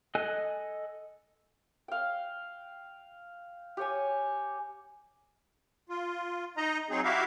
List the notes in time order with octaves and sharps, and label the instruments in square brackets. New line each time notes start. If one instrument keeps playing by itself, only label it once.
[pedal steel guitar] A4 D#5 G#5 F#6
[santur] F5 G5
G4 C#5 G#5
[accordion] F4
D#4 D#5 A#5
F#3 C4 D#4 G#4
E4 F#4 G4 E5 F5